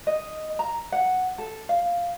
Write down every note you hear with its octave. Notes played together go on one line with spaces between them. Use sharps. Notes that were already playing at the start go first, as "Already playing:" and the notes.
D#5
A#5
F#5
A4
F5